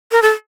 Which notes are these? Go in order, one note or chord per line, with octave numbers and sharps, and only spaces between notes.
A#4
A4